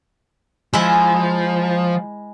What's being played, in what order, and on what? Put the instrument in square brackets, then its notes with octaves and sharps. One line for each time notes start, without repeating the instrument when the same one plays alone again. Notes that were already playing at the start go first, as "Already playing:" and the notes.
[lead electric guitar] F3 [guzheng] G#3 E4 E5